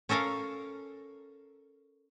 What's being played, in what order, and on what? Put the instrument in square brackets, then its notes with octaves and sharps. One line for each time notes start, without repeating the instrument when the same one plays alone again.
[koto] C#4 A4 A#4 C#5 F5